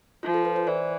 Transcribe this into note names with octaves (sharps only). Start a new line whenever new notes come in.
F3 F4
A4
B4
C5
E3 D5